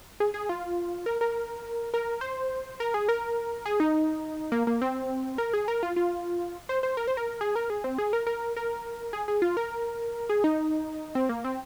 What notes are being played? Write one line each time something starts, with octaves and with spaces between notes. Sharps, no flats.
G#4
G#4
F4
A#4
A#4
A#4
C5
A#4
G#4
A#4
G#4
D#4
A#3
A#3
C4
A#4
G#4
A#4
F4
F4
C5
C5
A#4
C5
A#4
G#4
A#4
G#4
C4
G#4
A#4
A#4
A#4
G#4
G#4
F4
A#4
G#4
D#4
C4
A#3
C4